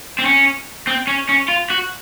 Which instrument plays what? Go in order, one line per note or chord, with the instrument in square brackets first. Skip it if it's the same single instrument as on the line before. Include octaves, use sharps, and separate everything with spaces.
[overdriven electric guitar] C4
C#4
C4
C#4
C#4
F4
F#4